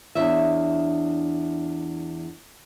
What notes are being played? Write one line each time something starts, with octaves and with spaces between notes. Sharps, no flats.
E2 D4 C#5 E5